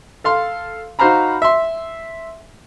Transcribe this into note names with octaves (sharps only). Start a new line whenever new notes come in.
A4 F5 C6
D#4 F#4 C5 F5 A#5 B5
E5 C6